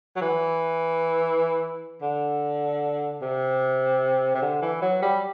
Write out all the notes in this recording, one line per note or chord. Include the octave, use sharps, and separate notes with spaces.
F#3
E3
D3
C3
C3
D3
E3
F#3
G3